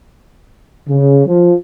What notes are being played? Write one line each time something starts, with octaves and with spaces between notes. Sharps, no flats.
C#3
F3